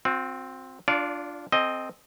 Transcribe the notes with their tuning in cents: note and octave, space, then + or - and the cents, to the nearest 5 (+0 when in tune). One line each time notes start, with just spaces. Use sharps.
C4 +0 F#4 -45
D4 +0 F4 +0 D5 -35
C4 +0 A4 -35 D#5 +0